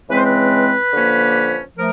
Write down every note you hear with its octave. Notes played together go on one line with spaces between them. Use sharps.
C#3 E3 G#3 C4 B4
C5
B4
D3 F3 A#3 C#4
F3 A3 A#4